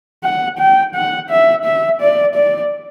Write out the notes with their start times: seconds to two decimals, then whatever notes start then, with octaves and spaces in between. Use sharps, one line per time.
0.24 F#5
0.59 G5
0.95 F#5
1.30 E5
1.65 E5
2.01 D5
2.35 D5